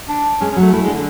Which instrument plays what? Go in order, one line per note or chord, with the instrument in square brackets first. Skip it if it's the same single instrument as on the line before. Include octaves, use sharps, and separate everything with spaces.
[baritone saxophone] D4
[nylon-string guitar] G#3 [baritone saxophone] C#4
[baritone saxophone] C#4
[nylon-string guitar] F#3 [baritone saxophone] A3
[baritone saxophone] A3 [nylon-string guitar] E4
[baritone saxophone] G#3
[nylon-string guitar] D4
[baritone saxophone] D3